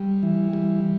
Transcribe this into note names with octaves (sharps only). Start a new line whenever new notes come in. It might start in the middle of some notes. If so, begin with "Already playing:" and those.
Already playing: G3
E3
G3